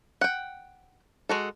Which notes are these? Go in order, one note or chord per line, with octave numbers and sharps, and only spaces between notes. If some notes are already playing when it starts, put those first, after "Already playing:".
F#5 G5
G#3 F#4 A4